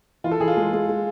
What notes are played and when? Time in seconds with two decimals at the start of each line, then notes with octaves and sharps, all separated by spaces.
0.24 E3 F4
0.31 A4
0.40 E3 G#4
0.48 F4
0.57 G#3
0.73 G#3
0.89 G#3